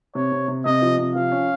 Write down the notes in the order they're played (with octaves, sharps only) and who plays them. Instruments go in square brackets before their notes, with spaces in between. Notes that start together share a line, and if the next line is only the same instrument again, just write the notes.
[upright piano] C3 [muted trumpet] C#5
[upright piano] C3
C3
[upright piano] C3 [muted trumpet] D#5
[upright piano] F3
C3
[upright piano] F3 [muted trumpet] F5
[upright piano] C#4